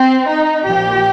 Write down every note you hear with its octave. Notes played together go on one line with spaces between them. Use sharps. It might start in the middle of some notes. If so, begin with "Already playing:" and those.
Already playing: C4
D#4
A#1 A#2 F3 G4